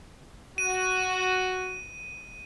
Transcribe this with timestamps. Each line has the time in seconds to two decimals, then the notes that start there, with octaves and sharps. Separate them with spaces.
0.58 F#4 D#7